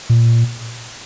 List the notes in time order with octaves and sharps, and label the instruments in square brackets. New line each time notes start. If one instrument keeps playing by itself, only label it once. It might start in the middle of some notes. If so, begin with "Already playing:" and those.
[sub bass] A#2